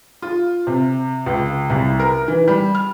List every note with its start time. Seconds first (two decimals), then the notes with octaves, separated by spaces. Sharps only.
0.22 F4
0.67 C3
1.26 C#2
1.70 C2
2.00 A#4
2.28 E3
2.48 G3
2.75 F6